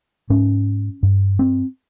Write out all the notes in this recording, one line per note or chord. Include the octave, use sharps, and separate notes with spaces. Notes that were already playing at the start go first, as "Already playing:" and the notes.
G#2 C#4
G2
C4